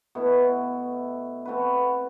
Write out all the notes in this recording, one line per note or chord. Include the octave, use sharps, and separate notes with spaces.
B2 A3 E4
A3 C4 F#4 B4